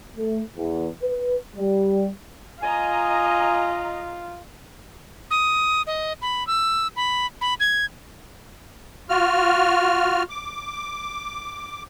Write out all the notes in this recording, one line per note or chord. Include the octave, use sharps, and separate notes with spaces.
A3
E2
B4
G3
F4 D#5 G#5 A#5
D#6
D#5
B5
E6
B5
B5
G#6
F4 F#4 F6
D6